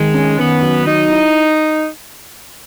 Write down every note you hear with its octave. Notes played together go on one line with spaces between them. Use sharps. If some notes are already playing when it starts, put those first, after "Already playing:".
Already playing: D#3 G#3
C#4
D#3 B3
F#3
F#3 D#4
E4